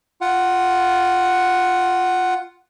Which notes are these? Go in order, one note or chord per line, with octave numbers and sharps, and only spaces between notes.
F4 F#5